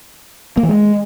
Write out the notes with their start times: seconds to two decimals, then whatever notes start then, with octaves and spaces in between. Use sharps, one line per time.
0.57 A#3
0.63 E3
0.69 G#3